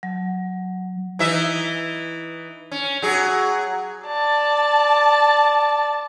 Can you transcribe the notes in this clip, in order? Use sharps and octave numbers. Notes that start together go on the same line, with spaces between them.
F#3
E3 D#4 E5
C#4
F#3 G#4
D5 A5